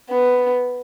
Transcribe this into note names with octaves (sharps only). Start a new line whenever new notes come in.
B3